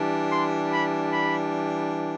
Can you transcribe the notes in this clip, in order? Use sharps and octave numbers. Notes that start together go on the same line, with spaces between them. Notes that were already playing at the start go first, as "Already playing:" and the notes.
Already playing: E3 G3 D4
C6
B5
B5